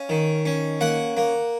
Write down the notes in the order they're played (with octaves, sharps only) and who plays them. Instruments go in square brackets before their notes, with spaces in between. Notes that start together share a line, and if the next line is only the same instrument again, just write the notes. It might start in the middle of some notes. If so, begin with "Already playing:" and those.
Already playing: [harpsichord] C#4 F5
D#3
C#4
A#3 F#5
A#3